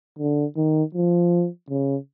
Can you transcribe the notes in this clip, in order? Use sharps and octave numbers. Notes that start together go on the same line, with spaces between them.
D3
D#3
F3
C#3